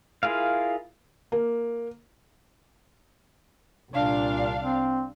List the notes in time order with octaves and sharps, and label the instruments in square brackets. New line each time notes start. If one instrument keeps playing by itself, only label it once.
[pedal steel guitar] E4 F4 G#4 A#4 F5
[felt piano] A#3
[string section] C2 D4 F5 [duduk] A#2
[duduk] C4